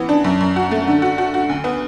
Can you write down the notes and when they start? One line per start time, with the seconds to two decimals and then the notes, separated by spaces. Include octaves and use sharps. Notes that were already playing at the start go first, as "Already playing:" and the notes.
Already playing: E3 B3
0.09 D4
0.24 F#2
0.41 F#2
0.56 F#4
0.71 A3
0.88 D3
1.02 F#4
1.18 F#4
1.34 F#4
1.49 D2
1.64 B3